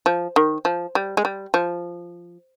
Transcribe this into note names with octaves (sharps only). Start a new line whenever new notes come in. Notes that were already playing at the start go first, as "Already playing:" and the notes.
F3
D#3
F3
G3
G#3
G3
F3